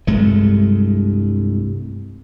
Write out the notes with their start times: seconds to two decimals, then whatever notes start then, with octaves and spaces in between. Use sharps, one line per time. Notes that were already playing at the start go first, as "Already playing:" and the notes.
0.07 C2 G2 G#3 A3